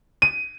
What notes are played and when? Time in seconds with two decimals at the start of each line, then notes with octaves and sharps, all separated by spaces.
0.22 D#7